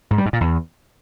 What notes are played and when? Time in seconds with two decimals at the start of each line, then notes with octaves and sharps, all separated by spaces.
0.11 G#2
0.18 G3
0.26 G#2
0.33 A#2
0.41 E2